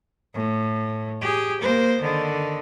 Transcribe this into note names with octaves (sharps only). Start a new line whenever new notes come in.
A2
G4 G#4
A#3 C5
D3 D#3